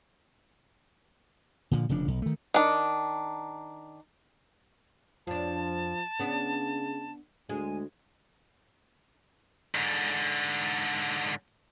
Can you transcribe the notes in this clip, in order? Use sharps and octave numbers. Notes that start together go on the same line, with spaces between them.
A#2 D3 F3
F1 C#3 F3 D4
B1
D#3 A3
D#3 D4
F2 F3 D4 A5
C#3 B3 D4
D2 G#3 G#5
G#2 D3